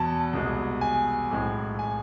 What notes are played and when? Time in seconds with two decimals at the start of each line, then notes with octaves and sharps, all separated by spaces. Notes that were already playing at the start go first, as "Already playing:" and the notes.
Already playing: E2 B2 B3 A5
0.33 C2 B2 G#3
0.81 G#5
1.31 B1 A2 G#3 C4
1.79 G#5